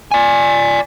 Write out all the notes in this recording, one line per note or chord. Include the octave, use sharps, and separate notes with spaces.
D5 G#5